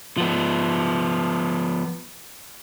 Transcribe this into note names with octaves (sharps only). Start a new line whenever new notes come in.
F3 B3